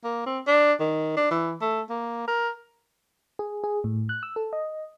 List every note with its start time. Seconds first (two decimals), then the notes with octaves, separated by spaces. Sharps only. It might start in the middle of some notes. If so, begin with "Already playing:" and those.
0.04 A#3
0.27 C4
0.47 D4
0.81 D#3
1.17 D4
1.31 E3
1.61 A3
1.90 A#3
2.28 A#4
3.39 G#4
3.64 G#4
3.84 A2
4.09 F#6
4.23 E6
4.36 A4
4.53 D#5